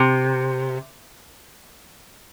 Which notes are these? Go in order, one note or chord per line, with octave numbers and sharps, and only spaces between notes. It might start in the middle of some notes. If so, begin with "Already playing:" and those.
Already playing: C3